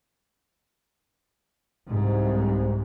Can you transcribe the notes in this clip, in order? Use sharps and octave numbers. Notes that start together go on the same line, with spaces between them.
C2 G#2